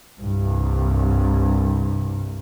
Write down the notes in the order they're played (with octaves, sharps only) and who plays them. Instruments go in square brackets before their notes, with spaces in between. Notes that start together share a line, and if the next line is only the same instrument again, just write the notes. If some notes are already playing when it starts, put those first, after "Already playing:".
[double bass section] C2 G2